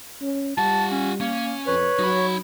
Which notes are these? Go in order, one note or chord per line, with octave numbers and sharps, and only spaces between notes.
C#4
G3 F4 F#5 A5
C#4
A#3 C#4
F2 B4 C#5
F#3 D#4 B5